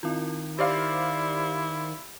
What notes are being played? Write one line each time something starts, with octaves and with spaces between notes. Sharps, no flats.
D#3 C4 E4 F4
E4 G4 C5 D5 F5